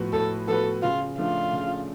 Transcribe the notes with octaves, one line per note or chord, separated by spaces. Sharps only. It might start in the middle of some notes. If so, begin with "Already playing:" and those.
Already playing: A2 F3 B3 F#4 B4
A2 A4
F3 B3 F#4 A4 B4
C#3 F4
F3 A3 D4 F4
C#3